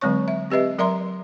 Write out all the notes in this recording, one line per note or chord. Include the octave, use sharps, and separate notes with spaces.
D3 F#3 G#3 C4 C#5 C#6
E5
C4 G4 B4 D#5 E5
F#3 A#4 D5 E5 A#5 C6